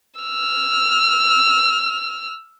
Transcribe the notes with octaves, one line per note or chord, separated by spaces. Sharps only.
E6 F6